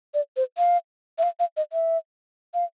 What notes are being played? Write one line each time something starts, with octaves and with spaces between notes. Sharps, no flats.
D5
C5
F5
E5
F5
F5
D#5
E5
F5